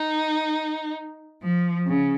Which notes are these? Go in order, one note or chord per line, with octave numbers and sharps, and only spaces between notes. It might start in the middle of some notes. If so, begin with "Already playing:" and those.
Already playing: D#4
F3
C#3